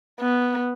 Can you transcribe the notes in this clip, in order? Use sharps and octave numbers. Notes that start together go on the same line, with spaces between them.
B3